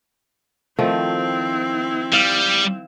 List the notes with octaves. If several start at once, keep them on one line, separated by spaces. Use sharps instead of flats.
D#3 F3 A3 C4 E4
G3 F5